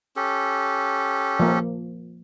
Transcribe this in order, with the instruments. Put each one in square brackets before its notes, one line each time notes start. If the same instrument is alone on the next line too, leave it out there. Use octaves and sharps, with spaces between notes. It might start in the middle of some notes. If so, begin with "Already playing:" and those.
[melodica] C#4 G4 A4
[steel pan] F3 A#3